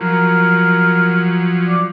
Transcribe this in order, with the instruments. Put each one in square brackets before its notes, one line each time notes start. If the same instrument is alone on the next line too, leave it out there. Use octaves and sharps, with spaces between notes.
[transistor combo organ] F3 F#3 [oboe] A#4
[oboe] D5